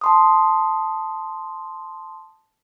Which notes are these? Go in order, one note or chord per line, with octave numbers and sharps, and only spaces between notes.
A5 C6 D#6